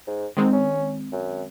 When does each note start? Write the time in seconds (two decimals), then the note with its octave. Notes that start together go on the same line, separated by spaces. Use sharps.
0.07 G#2
0.37 G#2 D#3 G#3 C4
0.53 C#4
1.12 F#2